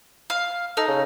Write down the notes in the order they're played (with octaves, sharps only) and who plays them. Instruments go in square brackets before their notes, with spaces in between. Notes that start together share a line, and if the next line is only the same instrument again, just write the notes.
[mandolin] F5
[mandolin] D#4 [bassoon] A4
[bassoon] C#3